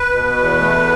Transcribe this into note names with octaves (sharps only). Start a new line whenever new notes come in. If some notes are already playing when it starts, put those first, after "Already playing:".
Already playing: B4
B2
E2
A3